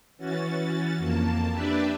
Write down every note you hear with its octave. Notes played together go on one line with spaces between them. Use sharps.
E3 C#4 F#4 A6
F2 A#3 A5
D4 G4 B4 D5 E5